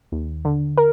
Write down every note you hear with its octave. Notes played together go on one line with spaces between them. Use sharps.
D#2
D3
A#4